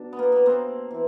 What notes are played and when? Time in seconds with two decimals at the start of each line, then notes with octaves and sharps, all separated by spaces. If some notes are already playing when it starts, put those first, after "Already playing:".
Already playing: B2 F#3 D4
0.13 B3
0.19 A#3
0.32 B3
0.46 A#3 C4
0.91 E3